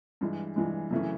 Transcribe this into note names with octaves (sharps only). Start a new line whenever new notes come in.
G2 E3 G#3
G2 E3 G#3
F#2 C#3 E3 A3 C#4